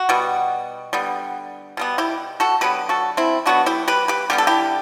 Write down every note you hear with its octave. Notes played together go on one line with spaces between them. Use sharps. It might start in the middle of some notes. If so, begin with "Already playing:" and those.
Already playing: F#4
B2 G3 B3
D3 G3 B3
B2 G3 B3
E4 G4
F#4 A4
D3 F#3 B3 G4 B4
F#4 A4
C4 E4
D3 F#3 B3 D4 F#4
E4 G4
G4 B4
G4 B4
D3 G3 B3 G4
A4
E4 G4